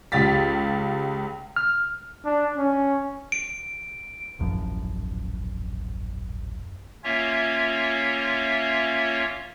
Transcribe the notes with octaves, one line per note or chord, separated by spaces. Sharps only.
C#2 G4 F5 A6 B6
F6
D4
C#4
D7
D#1 A1 F#2 F3
A#3 C#4 F4 C#5 E5